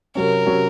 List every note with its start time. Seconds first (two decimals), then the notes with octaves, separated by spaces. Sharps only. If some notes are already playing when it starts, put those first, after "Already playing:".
0.15 C3 F#3 C#4 A#4
0.46 C3 F#3 C#4